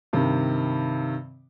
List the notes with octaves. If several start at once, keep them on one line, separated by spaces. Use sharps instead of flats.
G2 C3 D#3